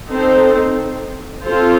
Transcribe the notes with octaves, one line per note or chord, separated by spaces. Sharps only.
C4 D#4 A4 C5
C4 F4 A4 C5